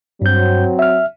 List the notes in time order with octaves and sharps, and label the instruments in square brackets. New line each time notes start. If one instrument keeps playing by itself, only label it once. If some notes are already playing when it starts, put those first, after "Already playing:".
[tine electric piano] G2 G6 [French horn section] F#3 C4
[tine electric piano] E5 F6